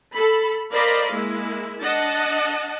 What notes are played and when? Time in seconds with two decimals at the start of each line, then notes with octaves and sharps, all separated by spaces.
0.14 A4 B5
0.73 A#4 C5 D5 D#5 F5 B5
1.12 G#3 A#3 E4
1.80 D4 D#5 F#5 A5